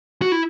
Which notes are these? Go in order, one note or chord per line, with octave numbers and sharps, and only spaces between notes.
F#4
E4